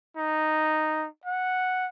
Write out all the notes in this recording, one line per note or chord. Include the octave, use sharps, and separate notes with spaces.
D#4
F#5